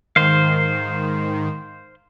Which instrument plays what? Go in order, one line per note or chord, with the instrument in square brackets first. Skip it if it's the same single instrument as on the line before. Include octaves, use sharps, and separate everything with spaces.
[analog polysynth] G#2 D#3 [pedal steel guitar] C5 F5